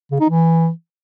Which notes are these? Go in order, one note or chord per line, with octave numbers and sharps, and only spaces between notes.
C#3
D#4
E3